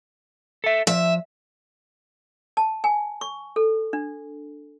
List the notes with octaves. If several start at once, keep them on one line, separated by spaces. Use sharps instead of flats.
A4 E5
F3 E5
A5
G#5
C#6
A4
D4